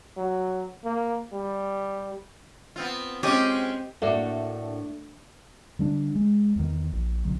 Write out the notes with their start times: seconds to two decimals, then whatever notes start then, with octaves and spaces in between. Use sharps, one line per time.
0.17 F#3
0.84 A#3
1.33 G3
2.76 B3 C4 F4
3.23 G#3 C4 C#4 F4 G4 D#5
4.02 A2 A3 A#3 D4 F#4
5.79 D3 G3 D4
6.15 G#3
6.56 E2 D#3
6.93 A#1
7.25 C2 D3 F#3